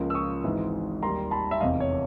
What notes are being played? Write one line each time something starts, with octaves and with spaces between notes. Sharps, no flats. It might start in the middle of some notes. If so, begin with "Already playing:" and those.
Already playing: C#2 C#3 F3 A#3
E6
C#6 D#6
G#1 G#2 E3 G#3
D#2 D#3 G3 A#5 C6
A5 B5
E5
F1 E2 C3 D#5 F5
C#5